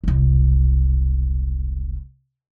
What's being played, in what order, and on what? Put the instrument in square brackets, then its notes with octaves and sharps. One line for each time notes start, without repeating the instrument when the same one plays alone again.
[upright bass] E1 C2